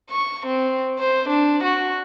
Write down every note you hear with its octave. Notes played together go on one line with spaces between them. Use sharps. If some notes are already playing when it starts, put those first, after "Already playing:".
C#6
C4
C5
D4
F#4